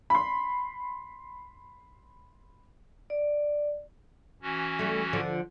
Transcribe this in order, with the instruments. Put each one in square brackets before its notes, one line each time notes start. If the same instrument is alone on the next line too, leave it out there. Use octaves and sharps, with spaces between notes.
[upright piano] B5 C6
[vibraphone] D5
[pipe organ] E3 C#4 F#4
[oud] G3 A3
D3 F3